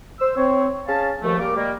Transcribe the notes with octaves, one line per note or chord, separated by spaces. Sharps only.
C5 E6
C4 C#5
C#4 G#4 F5 A5
D#2 F3 A3
G3 A#3 A#4 D6
G3 G#3 A#3